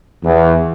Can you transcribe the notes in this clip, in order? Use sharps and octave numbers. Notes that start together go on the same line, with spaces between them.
E2